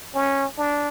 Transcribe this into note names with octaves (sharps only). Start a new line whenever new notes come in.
C#4
D4